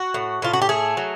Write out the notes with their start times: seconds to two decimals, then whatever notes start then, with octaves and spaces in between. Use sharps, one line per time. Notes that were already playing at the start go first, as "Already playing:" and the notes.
Already playing: F#4
0.14 A2
0.42 A2 F4
0.53 F#4
0.62 G4
0.69 A3 G#4
0.97 F#3